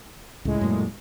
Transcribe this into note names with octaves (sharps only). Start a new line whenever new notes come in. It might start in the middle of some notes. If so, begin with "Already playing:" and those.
C#2 A2 G#3
F#2 A#2